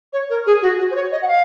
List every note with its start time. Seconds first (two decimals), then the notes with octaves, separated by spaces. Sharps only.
0.13 C#5
0.30 A#4
0.46 G#4
0.62 F#4
0.79 F#4
0.91 C5
0.95 C#5
1.12 D#5
1.22 F#5
1.28 F5